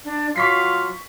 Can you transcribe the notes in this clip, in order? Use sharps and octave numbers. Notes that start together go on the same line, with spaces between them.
D4
F#3 F4 C#6 B6 C7